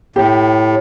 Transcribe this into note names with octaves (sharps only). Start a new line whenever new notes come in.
A2 G4